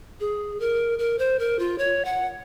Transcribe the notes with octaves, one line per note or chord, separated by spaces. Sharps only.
G#4
A#4
A#4
C5
A#4
F4
C#5
F#5